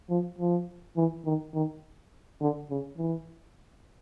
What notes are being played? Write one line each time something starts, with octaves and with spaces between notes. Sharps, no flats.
F3
F3
E3
D#3
D#3
D3
C#3
E3